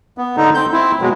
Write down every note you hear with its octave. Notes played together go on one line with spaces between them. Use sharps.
B3
D3 D#4
C4 G6
C4 E4
B2 F#3 G#3